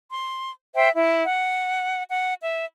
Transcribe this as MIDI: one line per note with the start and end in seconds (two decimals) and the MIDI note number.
0.09 0.51 84
0.75 0.87 72
0.75 0.87 76
0.75 0.87 79
0.94 1.23 64
1.24 2.03 78
2.10 2.35 78
2.42 2.65 76